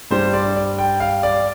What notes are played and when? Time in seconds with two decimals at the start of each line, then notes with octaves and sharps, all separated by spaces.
0.10 G2 G3 C5
0.33 D5
0.56 D5
0.79 G5
1.00 F5
1.23 D5